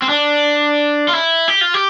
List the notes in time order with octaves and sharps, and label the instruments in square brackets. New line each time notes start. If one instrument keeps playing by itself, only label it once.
[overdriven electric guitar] C4
D4
F4
E4
G4
F4
G4